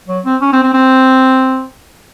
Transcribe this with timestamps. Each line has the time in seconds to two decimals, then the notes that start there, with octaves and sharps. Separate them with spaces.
0.08 F#3
0.25 C4
0.42 C#4
0.53 C4
0.63 C4
0.74 C4